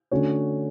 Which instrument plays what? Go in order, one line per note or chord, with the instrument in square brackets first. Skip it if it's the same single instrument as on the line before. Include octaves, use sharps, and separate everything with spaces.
[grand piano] D3 A3 C#4 F#4 C#5